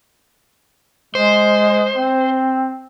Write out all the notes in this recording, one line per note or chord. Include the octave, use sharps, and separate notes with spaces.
G#3 C5
C4